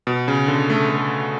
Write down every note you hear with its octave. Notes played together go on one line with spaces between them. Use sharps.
B2
C#3
D3
A3
A3